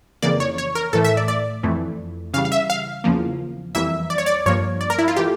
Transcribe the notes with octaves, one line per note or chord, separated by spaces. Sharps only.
F2 C#3 E3 A#3 D5
C#5
C#5
A#4
A2 E3 A3 A4
E5
D5
D5
F2 E3 A3
C#3 E3 G3 F5
F5
E5
F5
E2 C#3 F3 A#3
F2 E3 G3 A#3 E5
D5
C#5
D5
G2 F3 A#3 C#5
D5
A#4
E4
F4
E3 A3 G4